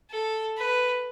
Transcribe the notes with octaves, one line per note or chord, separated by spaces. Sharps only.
A4
B4